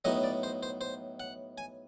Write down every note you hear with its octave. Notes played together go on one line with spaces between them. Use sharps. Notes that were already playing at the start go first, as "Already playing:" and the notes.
A2 F#3 B3 D#4 D#5
D5
C5
C5
C5
F#5
G#5